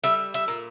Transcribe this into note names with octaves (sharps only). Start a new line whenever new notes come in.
G3 E5
E5
A#2